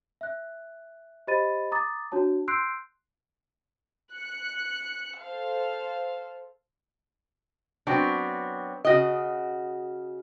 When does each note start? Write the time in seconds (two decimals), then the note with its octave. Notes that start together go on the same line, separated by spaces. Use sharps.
0.21 E5 F#6
1.27 G4 C5 D#5 B5 A6 D#7
1.72 A#5 D6 D#6 A6
2.12 D4 F#4 C#5 A5
2.48 C6 E6 F#6 G6 C7 D7
4.14 F#6 C#7
5.21 A4 C5 F5
7.87 F#3 B3 C4 D4
8.85 C#3 F#4 D#5